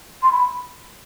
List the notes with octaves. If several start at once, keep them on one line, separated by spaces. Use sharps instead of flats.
C6
B5